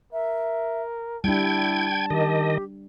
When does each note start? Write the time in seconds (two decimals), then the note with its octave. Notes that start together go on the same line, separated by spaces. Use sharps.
0.13 A#4 E5
1.24 G3 D4 E4 G5 A5 G#6
2.10 D#3 G4 D#5